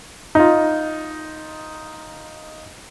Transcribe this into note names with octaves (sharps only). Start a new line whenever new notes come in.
D#4 F4